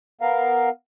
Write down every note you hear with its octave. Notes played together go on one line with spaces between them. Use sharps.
B3 A#4 F5